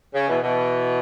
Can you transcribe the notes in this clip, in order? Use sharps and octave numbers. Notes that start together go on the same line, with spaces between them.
C#3
B2 E3
B2 E3